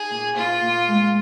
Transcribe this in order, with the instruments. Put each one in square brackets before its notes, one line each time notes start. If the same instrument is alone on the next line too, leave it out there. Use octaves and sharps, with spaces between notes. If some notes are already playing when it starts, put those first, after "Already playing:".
Already playing: [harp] D#4 [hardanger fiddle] G#4
[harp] A#2
[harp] A#2 [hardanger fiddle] F4
[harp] A#2
G#3